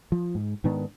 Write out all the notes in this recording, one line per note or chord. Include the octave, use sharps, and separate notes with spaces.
F3
G#2
G#2 D#3 B3 D4